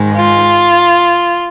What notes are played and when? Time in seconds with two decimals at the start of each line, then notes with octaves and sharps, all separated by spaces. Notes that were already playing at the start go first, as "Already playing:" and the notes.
Already playing: G#2 D#3 G#3
0.17 F4